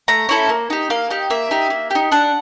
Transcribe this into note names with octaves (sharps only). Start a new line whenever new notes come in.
A3 A#5
C#4 E4 A4
A#3
D#4 G4
A#3 F5
D#4 G4
A#3 E5
D#4 G4
A#3
D#4 G4
D4 F#5